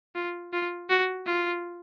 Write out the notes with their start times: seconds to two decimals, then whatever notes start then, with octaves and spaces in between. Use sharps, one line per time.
0.15 F4
0.53 F4
0.90 F#4
1.26 F4